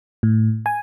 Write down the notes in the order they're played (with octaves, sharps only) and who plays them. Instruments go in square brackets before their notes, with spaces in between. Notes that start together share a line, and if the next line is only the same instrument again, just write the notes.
[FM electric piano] A2
G#5